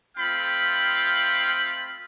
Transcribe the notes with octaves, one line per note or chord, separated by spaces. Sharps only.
A3 C4 F4 F5 G5 B5